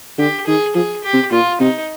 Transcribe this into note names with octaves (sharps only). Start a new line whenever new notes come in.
D3 G4
D#3 G#4
F3 G#4
G4
C3
A#2 F4
C3 D#4